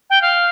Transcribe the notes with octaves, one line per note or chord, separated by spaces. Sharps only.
G5
F5